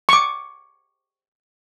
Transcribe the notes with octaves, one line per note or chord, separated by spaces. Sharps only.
C#6 D6